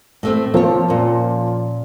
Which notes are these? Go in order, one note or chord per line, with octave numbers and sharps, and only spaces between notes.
A2 A3 C4
F3 A#3 C4 C#5
A#2 C#4